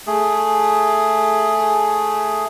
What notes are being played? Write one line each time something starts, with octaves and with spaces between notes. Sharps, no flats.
A3 G#4